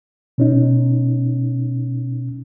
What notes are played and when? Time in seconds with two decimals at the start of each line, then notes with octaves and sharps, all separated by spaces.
0.38 B2 C#4 D#4